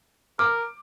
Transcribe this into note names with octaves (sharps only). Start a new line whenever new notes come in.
A#4 D6 F6